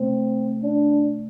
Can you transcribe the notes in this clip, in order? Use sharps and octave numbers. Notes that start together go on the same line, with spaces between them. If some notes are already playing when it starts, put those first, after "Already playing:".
Already playing: C3 A3 C4
D4